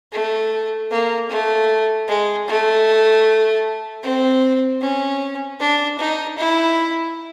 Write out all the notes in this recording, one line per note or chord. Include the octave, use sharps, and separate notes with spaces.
A3
A#3
A3
G#3
A3
C4
C#4
D4
D#4
E4